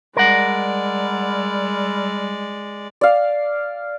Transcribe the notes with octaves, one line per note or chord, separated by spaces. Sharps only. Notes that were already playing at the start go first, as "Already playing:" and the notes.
G3 G#3 A#4 D5 F#5
D5 F5